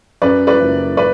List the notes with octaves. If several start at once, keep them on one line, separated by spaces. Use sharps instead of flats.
F#2 B4 D5
B4 D5
F#1
B4 D5